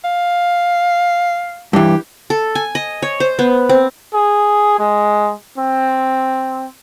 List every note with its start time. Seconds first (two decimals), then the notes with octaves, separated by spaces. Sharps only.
0.04 F5
1.73 G2 E3 G4
2.30 A4
2.55 G#5
2.75 D#5
3.02 C#5
3.20 C5
3.39 B3
3.69 C4
4.14 G#4
4.79 G#3
5.58 C4